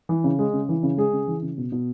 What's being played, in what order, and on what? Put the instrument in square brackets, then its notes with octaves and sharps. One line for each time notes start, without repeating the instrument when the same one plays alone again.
[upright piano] E3
C#3
G#3
C#3
E3
C#3
G#3 G#4
C#3
E3
C#3
B2
B2